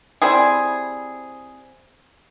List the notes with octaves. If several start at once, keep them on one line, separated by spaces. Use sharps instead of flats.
G3 C4 E4 G#4